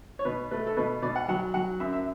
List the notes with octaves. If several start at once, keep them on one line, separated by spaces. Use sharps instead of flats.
C#5
B2 B4
A3 B4
A4
B2 B4
B2 D5
F#5
F#3 F#5
F#3 F#5
F#2 E5
E5